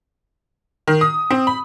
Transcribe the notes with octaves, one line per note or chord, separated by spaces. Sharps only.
D#3
D#6
C4
B5